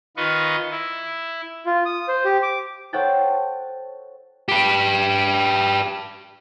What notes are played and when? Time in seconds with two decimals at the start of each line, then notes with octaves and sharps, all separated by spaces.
0.17 D#3 F4 B4 D#5 C#6
0.72 E4
1.66 F4
1.86 D#6
2.08 C5
2.25 G4
2.42 D6
2.93 A4 C5 C#5 F#5 G5 A6
4.49 G4 B4